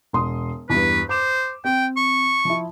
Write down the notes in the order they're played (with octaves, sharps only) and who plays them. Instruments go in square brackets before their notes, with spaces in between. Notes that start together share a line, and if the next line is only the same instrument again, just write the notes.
[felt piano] E1 C6 D#6
[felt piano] E2 G2 [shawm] B4
[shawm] C5 [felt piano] D6 E7
[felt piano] C4 [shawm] G5
[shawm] C#6
[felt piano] F3 E4